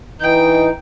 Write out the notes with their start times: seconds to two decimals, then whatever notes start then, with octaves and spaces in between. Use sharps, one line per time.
0.20 E3 D#4 G5